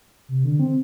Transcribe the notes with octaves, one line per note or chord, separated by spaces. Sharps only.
C3
D3
C4